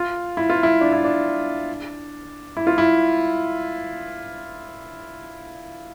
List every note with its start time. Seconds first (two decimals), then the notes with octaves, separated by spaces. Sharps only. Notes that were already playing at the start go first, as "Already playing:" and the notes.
Already playing: F4
0.37 E4
0.50 F4
0.63 E4
0.81 D4
0.93 E4
1.04 D4
2.57 E4
2.67 F4
2.78 E4